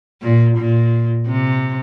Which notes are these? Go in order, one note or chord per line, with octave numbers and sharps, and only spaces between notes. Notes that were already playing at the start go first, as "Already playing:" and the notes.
A#2
A#2
C3